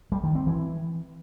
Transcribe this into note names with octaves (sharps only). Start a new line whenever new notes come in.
G3
D#3
C4
E3